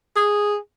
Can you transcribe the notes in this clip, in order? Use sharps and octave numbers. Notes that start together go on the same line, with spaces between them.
G#4